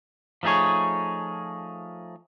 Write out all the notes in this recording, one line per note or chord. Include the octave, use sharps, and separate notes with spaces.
F3 A3 D#4 G#4 C#5